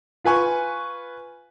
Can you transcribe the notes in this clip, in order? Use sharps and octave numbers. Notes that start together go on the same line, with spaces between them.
F4 B4 G#5 C#6